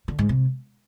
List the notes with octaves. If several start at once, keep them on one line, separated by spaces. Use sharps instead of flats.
D3
G#2
C3